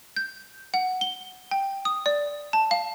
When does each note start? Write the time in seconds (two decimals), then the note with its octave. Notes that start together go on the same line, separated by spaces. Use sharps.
0.16 G6
0.74 F#5
1.01 G7
1.51 G5
1.85 D#6
2.06 D5
2.53 A5
2.71 F5